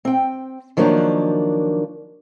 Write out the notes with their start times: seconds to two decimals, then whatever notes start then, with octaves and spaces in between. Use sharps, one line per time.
0.05 C4 G5
0.77 D#3 F3 F#3 A#3 C#4 D4